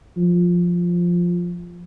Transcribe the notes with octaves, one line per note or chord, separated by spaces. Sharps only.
F3